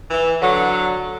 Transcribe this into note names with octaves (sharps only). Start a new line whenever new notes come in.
E3
D3 F#3